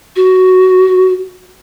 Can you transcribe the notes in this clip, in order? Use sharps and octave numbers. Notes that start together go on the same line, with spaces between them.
F#4